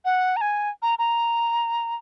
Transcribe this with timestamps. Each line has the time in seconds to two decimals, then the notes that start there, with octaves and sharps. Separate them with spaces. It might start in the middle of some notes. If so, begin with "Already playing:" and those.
0.05 F#5
0.37 A#5
0.41 G#5
0.82 A#5
0.99 A#5